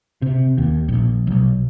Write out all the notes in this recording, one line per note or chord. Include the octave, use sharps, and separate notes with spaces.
C3
D#2
A#1
B1